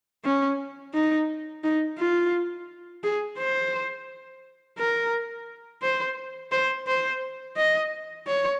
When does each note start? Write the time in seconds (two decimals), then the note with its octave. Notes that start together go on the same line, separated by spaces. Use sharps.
0.24 C#4
0.94 D#4
1.64 D#4
1.98 F4
3.03 G#4
3.38 C5
4.78 A#4
5.82 C5
6.52 C5
6.87 C5
7.57 D#5
8.27 C#5